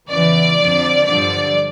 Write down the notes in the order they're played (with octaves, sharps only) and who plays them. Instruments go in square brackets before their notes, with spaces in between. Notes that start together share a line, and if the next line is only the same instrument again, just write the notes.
[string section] E2 C#3 E3 D5
F2 D3 F3
G2 D3 F3 D5